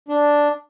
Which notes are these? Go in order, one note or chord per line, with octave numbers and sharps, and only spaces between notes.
D4